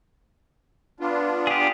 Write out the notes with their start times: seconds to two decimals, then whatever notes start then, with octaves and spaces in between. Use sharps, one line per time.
1.00 B3 D4 F4
1.47 G4 G#4